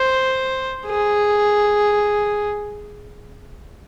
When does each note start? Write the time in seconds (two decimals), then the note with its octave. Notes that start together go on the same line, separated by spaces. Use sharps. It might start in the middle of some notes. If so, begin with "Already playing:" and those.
Already playing: C5
0.86 G#4